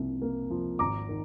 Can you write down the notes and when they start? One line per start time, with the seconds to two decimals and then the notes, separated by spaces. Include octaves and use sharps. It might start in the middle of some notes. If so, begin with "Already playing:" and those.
Already playing: C2 C3 F3 A#3
0.22 A#3
0.50 F3
0.79 G#1 A#5 D6
1.09 D#3